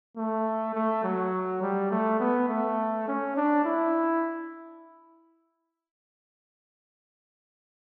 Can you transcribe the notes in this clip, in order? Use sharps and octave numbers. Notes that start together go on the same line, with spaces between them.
A3
A3
F#3
G3
A3
B3
A3
C#4
D4
E4